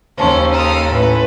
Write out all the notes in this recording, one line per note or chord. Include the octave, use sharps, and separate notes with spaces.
D#2 C#3 C#4 C5 A5 C6
A4 A#5 C6 D#6 F6
A2 C#4 B4